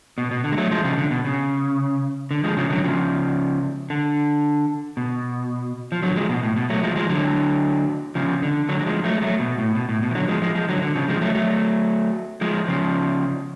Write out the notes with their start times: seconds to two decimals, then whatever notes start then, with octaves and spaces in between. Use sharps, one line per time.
0.18 B2
0.31 B2
0.44 D3
0.52 G#3
0.57 F#3 A3
0.71 F3 G#3
0.84 C#3 F3
0.98 D3
1.11 B2
1.25 C#3
2.31 D3
2.44 F3 G#3
2.57 C#3 F3
2.70 D3 F#3
2.84 C#3 F3
3.90 D3
4.97 B2
5.92 F3
6.03 D3 F#3
6.16 F3 G#3
6.29 B2
6.43 A2
6.56 B2
6.70 F#3 A3
6.83 F3 G#3
6.91 F#3
6.96 F3 G#3
7.09 D3 F#3
8.15 C#3 F3
8.42 D3
8.69 D3 F#3
8.80 F#3
8.86 F3 G#3
9.04 F#3 A3
9.16 G#3
9.22 F#3 A3
9.40 B2
9.58 A2
9.75 B2
9.89 A2
10.02 B2
10.11 F3
10.15 D3 F#3
10.28 F3 G#3
10.42 F3 G#3
10.55 F3 G#3
10.69 D3 F#3
10.82 D3
10.95 C#3 F3
11.08 F3 G#3
11.21 F#3 A3
11.35 F#3 A3
12.41 F3 G#3
12.68 C#3 F3